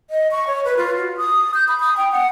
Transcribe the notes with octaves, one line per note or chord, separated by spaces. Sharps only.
D#5
C#6
C#5
B4
F4
F#4
D#6
G6
B5
D#6
G5
F#5